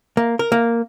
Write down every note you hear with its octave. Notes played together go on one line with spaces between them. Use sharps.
A#3
A#4
A#3